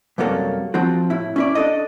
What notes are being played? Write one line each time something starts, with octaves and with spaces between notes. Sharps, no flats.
C2 F#2 C3 F#3 A#3 A4
F3 C4 F#4
A2 E4
C#4 E4 D5
D4 A4 D#5